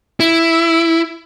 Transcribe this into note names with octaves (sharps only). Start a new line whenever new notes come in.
E4